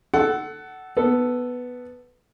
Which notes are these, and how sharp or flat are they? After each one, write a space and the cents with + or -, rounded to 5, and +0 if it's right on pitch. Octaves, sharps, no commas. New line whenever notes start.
A4 -5 F#5 +20
B3 +0 A4 +0